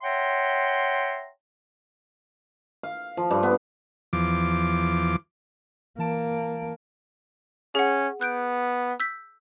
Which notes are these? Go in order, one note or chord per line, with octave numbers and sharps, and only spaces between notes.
C#5 E5 F#5 G5 A#5 C6
F5
F3
G2
B3
E2 F3 D6
E3 A#3 A5 D7
C#4 G#4 F#5
B3 F#6 G6 D7
E6 G6 B6